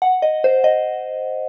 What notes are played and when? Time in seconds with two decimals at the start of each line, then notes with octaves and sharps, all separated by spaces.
0.02 F#5
0.22 D#5
0.44 C5
0.64 D#5